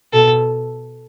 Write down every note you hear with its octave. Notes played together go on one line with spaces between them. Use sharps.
B2 A4